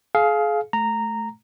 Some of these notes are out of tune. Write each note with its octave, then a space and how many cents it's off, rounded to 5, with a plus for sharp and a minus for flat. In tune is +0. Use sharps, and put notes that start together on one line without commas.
G#4 +35 F5 +0
A3 -25 A#5 -10